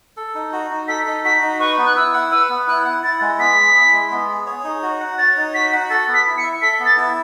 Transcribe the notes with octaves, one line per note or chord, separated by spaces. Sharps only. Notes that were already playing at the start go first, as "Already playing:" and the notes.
A4
D#4
F#4
D#4
A4 B6
D#4
F#4 B6
D#4
B4 C#6
B3
F#6
E4 E6
F#5
B4 E6
B3
E4 F#6
F#5
E4 A6
G#3
B3 B6
G#4
E4
G#3
B3
G#4
C#5
D#4
F#4
F#5
C#5 A6
D#4
F#4 B6
F#5
A4 A6
B3
B6
E4
C#7
E5
A4 B6
B3
A6
E4